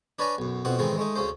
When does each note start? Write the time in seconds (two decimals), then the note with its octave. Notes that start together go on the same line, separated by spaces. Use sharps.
0.19 D4 B4 C#5 D5 G#5 A#5
0.38 B1 F#2
0.65 F2 B2 C4 F#5
0.79 A2 D#3 E3 G#3 C4
0.97 G#3 A3 D#4
1.15 D2 C#3 C#4 C5